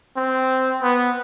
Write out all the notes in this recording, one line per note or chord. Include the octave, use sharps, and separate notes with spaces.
C4
B3